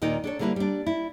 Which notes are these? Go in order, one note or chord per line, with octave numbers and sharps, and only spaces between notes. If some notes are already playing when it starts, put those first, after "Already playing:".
D#2 A#2 D#3 D#4 D5
D4 A4 C#5
D3 G3 A#3 E4 B4
G3 D4
E4